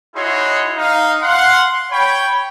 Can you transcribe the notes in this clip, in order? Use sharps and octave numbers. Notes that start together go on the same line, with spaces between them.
D#4 E4 F#4 G#4 C#5 C6
D#4 F5
F5 F#5 C6
C#5 G5 B5